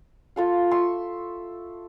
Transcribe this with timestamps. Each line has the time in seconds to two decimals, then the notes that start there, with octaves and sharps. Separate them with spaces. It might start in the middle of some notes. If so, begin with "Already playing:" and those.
0.36 F4 A4 F5
0.71 E5 C6 C#6